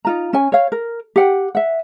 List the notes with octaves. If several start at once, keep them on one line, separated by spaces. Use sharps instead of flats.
D#4 F4 A#5
C#4 G#5
C#5 F5
A#4
G4 F#5 G5
E5 F#5